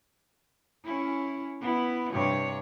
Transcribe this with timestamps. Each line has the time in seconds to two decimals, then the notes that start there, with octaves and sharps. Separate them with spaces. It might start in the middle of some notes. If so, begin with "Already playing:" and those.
0.84 C#4 E4
1.61 B3 E4
2.12 G2 C3 C#5